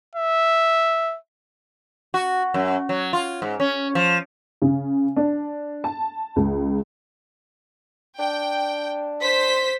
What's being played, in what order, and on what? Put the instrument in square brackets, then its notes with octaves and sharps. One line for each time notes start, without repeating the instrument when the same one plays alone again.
[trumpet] E5
[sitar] F#4
F#2
F#3
F4
G#2
C#4
F3
[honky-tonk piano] C#3
D4
A5
C#2
[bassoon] D4 [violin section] G5
[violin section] C5 B6